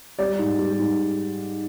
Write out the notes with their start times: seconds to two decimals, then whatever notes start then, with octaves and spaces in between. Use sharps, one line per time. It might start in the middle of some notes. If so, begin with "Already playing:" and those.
0.19 G3 D5
0.39 G#2
0.59 G3
0.79 G#2